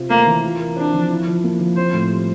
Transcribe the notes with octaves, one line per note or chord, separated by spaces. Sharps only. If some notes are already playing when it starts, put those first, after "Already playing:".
Already playing: C3 C4 F4
A3 A#3
E3
F4
A#4
C4 D4
F3
E4
F3
A#3
F3
C4 C5
A2
G3